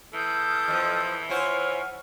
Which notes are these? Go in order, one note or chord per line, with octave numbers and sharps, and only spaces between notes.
E3 A4 D#6 F6 G6
F2 F3
F4 C5 C#5 F#5 G#5 F6